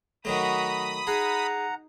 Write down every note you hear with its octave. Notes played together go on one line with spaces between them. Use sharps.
D#3 F#3 A3 F#4 A#5 B5 D#6
D#4 G#4 F#5 A#5